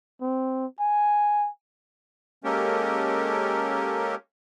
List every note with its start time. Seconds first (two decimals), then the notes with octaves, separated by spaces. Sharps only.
0.21 C4
0.80 G#5
2.44 G#3 A#3 C#4 G4 A4 A#4